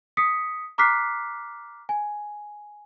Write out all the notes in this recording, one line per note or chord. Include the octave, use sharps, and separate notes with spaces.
D#6 B6 C#7
A#5 D6 F6 F#6 B6 C7
G#5